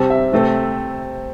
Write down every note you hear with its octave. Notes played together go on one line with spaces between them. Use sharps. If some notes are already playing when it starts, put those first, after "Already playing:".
Already playing: C3 G3 C4 A5
E5
C3 A3 C4